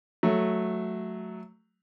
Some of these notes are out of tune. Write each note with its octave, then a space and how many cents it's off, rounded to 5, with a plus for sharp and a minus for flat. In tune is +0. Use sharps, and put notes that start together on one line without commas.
F#3 +0 A3 -5